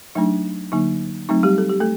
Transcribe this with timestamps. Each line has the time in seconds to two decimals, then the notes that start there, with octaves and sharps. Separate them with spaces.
0.15 F#3 A3 D4 D#4
0.72 D3 F#3 A#3 D#4
1.29 F#3 A3 C4 D#4
1.43 G3 G4
1.58 A4
1.69 G4
1.80 A3 A4